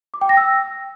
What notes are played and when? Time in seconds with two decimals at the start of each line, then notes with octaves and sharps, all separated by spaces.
0.14 D6
0.21 G5
0.29 A#6
0.37 E6